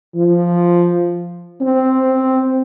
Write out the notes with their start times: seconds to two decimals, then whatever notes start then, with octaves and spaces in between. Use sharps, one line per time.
0.15 F3
1.61 C4